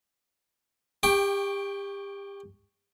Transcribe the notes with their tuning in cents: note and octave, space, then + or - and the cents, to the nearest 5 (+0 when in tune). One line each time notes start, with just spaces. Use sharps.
G4 +30 G5 +5 C#6 +0